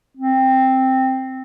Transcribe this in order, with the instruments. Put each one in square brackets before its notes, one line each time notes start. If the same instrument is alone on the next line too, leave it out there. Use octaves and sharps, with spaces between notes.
[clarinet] C4